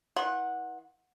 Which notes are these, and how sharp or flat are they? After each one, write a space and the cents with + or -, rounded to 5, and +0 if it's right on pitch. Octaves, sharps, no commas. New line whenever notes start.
E3 -35 F#5 -10 C6 +35